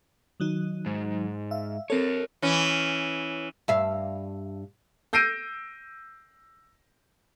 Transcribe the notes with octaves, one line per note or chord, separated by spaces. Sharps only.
D#3 F#3 D#4
G#2
E5 F5
C4 A4 A#4 C#5
E3 C#4
G2 E5 F5
E6 G6 A#6 C7 D7 D#7